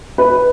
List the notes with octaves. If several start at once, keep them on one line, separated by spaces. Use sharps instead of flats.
B4